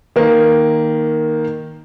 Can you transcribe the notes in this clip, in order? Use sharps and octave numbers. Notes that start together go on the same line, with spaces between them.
D#3 A#3